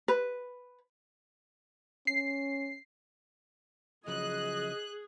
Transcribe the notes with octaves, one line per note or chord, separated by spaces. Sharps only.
B4
C#4 C7
C#3 F3 F#3 G#4 D#5 F#6